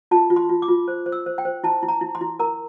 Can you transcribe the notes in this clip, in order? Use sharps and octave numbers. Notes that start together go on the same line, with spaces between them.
F4 A5
F4
C6
F4
D6
F4
C5
C5
E6
C5
G5
C5
E4 A5
E4
A#5
E4
C6
E4
A#4 A#5